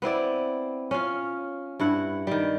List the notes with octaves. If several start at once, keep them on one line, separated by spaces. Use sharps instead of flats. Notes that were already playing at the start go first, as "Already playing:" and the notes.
B3 C4 E4 D5
C#4 F4
G2 E4 F#5
D#3 G3